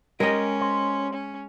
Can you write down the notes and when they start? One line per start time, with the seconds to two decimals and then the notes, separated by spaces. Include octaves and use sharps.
0.20 G#3 C#4 G4 A#4 D#5
0.61 C5
1.13 C#4